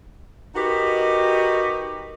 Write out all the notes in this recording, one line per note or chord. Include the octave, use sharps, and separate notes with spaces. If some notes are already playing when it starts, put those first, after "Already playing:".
D#4 F#4 G4 A#4 B4 D#5